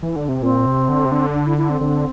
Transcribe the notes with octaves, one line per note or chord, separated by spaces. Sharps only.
E3
D3
C3
A#2 C4
C3
D3
C3
D3
D4
E4
E4
C4
D3